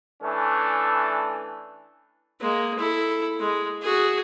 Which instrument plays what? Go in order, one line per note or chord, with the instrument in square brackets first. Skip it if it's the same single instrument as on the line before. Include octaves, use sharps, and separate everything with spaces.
[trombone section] E3 A3 C#4 D4
[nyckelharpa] G#3 A#3
E4 A4
G#3
F#4 G#4